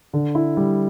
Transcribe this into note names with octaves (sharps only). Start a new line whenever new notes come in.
D3
E4
G3